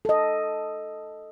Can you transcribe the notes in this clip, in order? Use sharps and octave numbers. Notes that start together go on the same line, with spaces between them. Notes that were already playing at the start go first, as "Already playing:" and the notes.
A4 D#5